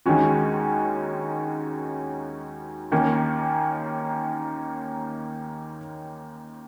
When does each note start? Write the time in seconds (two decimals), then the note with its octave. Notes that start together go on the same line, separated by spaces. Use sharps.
0.06 D#2 D#3 G#3 C#4 F#4
2.92 D#2 D#3 A#3 C#4